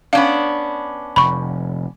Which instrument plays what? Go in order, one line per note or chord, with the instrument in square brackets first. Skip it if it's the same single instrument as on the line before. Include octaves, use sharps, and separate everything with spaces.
[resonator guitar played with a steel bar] B3 C#4 D4 [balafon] F5
[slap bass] F1 [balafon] B5 C#6